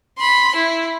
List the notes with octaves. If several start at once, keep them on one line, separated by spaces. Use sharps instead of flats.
B5 C6
E4